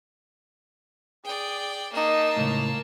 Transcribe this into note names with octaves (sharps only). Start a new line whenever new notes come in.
G#4 D5 G5
A#3 D#4 D#5 A5
C#2 F#2 A2